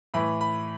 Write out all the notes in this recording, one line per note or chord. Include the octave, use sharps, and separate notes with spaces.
A2 E3 B5
B5